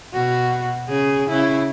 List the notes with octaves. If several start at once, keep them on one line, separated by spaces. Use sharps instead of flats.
B2 F#4
C#3 G#4
C#3 E4